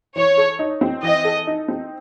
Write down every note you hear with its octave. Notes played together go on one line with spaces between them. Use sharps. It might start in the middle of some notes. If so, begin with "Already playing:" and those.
E3 C#5
A4
D#4
C4
E3 D#5
A4
D#4
C4